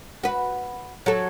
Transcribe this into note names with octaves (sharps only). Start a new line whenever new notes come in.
F#4 B4
F#3 A4